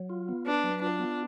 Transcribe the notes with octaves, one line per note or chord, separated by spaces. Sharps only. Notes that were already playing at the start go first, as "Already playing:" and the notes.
Already playing: F#3
F4
B3
D4 B4
F#3
D4 F4
B3